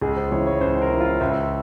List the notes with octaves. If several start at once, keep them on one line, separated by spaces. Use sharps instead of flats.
C#2 G#4
C5
C#3 E3 C#5
C#5
C#2 C5
A#4
C#3 E3
F4
C#2 E5